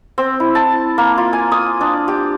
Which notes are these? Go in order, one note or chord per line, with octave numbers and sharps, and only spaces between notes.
C4
E4
A5
A#3
F4
G#5
D#6
D4
G4